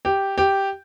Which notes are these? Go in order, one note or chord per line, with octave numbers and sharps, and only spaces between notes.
G4
G4